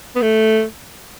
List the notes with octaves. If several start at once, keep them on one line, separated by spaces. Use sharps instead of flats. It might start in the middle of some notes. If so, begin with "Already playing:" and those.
B3
A3